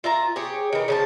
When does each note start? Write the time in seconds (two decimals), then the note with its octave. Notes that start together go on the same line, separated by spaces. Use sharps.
0.04 F4 E5 A#5
0.36 G4 G#4 C#5
0.73 D#3 E3
0.88 C#3 F3 A5